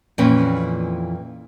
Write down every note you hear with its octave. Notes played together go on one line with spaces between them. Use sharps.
F2 A#2 E3 C#4 B4 G5